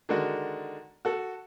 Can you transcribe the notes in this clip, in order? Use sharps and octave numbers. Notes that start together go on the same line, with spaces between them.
D3 D#3 G#3 D4 F#4
F#4 A4